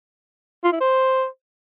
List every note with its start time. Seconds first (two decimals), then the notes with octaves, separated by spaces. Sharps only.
0.64 F4
0.72 E4
0.80 C5